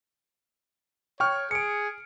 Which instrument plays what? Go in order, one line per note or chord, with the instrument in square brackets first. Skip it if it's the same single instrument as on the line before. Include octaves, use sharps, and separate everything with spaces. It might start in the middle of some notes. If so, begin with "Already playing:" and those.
[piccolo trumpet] C#5 [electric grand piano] G5 C#6 F6
[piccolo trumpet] G#4 [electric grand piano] C#7 D7